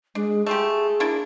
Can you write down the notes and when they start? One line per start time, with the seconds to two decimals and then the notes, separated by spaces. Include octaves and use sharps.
0.15 G#3 D4
0.46 A3 F4 G4 G#4
1.00 A#3 D4 E4